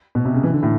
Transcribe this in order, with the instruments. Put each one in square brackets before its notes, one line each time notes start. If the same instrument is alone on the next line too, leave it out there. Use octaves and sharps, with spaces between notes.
[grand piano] B2
C3
C#3
E3
D3
A2